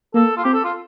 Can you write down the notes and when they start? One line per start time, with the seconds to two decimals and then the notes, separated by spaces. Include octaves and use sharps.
0.15 A#3 A4
0.37 F4
0.44 C4 G4
0.54 A4
0.64 F4